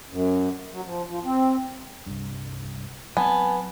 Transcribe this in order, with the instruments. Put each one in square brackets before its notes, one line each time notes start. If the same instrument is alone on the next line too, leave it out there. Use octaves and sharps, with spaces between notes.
[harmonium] F#2
F#3
F3
F3
C4
[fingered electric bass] C2 G2
[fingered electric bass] F#3 C4 [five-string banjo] B3 [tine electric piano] G#5 A5